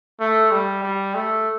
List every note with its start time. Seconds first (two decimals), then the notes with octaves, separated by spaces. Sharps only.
0.21 A3
0.52 G3
0.83 G3
1.15 A3